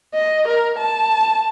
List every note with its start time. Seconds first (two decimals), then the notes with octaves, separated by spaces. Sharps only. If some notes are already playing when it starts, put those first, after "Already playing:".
0.14 D#5
0.48 A#4
0.79 A5